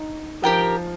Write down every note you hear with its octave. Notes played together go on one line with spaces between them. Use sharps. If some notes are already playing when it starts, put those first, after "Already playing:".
Already playing: D#4
F3 G4 A#4 G5